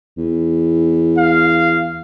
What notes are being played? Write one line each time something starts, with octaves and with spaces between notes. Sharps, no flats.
E2
F5